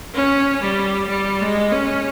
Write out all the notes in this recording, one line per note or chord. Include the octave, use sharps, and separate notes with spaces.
C#4
G3
G3
G#3
C#4